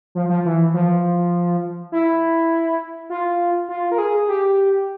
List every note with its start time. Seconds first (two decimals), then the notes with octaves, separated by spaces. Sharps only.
0.15 F3
0.29 F3
0.45 E3
0.74 F3
1.92 E4
3.10 F4
3.69 F4
3.92 A#4
3.98 G#4
4.28 G4